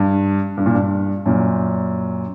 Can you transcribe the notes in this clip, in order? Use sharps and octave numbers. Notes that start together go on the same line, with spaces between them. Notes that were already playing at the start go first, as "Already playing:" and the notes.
Already playing: G2
G2
A#2
G2
F#2 A#2